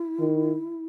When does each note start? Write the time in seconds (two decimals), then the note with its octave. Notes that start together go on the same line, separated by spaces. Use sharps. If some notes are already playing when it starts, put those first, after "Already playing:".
Already playing: E4
0.20 D#3